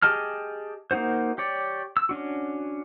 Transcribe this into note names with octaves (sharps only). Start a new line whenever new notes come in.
G4 G#4 D#5 A5 F6
A#3 C#4 D#4 F#4 C5
G4 C#5 D5
E6
C#4 D4 F#4